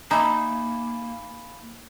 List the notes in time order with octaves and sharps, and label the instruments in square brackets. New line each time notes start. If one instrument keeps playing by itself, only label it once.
[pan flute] A#3 [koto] D#4 E5 [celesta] G#5 B5 [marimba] A#5